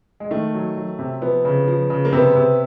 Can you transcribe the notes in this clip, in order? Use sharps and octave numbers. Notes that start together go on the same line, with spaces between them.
G#3
D#3 A3
F#3
F#3
C3
F3 B3
C#3
F3
C#3
A#3
C3 B3
C3